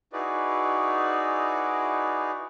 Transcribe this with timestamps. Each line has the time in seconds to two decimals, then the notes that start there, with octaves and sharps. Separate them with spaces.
0.13 D#4 E4 F#4 G#4 B4 D5